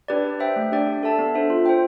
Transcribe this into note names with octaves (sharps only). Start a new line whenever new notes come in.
D4 G4 B4 D5
G4
C5 E5 G5
A3
D4 G4 D5 G5
D4
A4 E5 A5
B3
D4 A4 C5 E5
F4
C5 G5